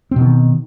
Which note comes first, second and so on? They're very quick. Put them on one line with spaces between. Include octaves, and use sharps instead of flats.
C4 B2 D#3